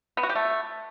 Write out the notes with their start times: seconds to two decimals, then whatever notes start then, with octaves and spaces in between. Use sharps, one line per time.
0.17 B3
0.23 F#4
0.29 G4
0.35 A3